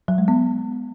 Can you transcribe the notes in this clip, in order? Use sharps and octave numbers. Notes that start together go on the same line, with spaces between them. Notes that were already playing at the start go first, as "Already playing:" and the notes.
F#3
G#3
B3